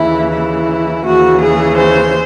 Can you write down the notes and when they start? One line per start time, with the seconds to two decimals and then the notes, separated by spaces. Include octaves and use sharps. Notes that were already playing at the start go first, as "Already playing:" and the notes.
Already playing: D#2 C#3 E3 E4
0.30 E4
1.04 D#2 C#3 E3 F#4
1.41 G#4
1.77 C5